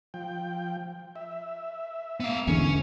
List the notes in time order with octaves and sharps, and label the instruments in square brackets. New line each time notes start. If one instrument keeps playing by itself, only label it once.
[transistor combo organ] F3 G5
E5
[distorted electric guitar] B3 F5
[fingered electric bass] E2 D3 [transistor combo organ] G#2 E3 [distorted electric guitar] C#4